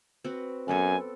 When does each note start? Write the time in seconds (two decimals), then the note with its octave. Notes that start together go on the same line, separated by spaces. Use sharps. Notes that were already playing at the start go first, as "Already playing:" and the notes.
0.24 C4 F#4 B4
0.68 F#2 B3 C4 A4 G#5